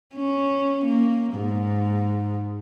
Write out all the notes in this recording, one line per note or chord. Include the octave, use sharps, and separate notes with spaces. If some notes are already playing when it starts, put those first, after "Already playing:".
C#4
A#3
G#2